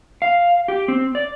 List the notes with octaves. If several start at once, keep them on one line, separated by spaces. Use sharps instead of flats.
F5
G4
C4
D5